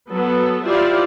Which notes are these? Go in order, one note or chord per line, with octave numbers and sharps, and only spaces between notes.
F#3 B3 A4
E4 F4 G4 C5 D5 F5